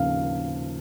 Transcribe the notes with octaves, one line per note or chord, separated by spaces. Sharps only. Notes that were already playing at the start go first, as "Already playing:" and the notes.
Already playing: D#2 C#3 F3 A#3 F5